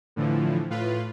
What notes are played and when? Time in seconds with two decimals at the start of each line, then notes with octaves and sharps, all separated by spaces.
0.16 A2 D3 E3 F3
0.70 A2 F4 B4